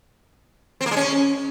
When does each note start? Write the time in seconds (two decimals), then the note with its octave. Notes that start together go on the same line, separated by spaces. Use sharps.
0.81 C4
0.86 A#3
0.91 G#3
0.97 C#4